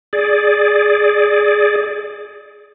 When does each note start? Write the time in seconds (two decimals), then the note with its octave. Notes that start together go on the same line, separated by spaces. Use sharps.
0.13 G#4 D5